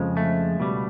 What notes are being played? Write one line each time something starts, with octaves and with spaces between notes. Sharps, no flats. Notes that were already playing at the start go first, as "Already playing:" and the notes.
Already playing: F2 C#3 F3 G#3
A3
C#2 B2 G3